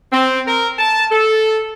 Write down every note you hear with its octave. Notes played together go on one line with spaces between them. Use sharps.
C4
A#4
A5
A4